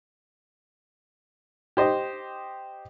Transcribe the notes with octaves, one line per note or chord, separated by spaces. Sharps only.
G4 C5 D#5